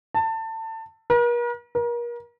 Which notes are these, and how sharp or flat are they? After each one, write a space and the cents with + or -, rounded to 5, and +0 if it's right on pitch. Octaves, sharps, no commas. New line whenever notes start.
A5 +25
A#4 +45
A#4 +35